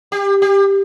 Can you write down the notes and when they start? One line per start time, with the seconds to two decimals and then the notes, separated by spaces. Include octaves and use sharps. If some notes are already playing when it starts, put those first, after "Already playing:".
0.12 G4
0.42 G4